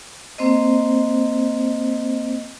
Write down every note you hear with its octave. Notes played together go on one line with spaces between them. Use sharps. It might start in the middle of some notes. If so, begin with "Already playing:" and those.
A#3 C4 C5 D#5